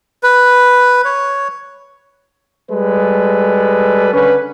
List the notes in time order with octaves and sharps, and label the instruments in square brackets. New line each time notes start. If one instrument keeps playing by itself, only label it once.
[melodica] B4
C#5
[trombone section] G3 G#3 A4 B4
D3 C#4 B4